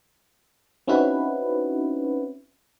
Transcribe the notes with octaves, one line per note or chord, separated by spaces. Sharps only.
C4 C#4 D#4 E4 F#4 B4